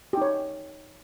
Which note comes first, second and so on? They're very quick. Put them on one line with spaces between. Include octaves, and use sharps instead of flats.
G4 D#4 C#5